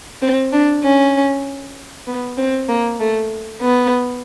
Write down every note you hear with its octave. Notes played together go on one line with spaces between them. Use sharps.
C4
D4
C#4
B3
C4
A#3
A3
B3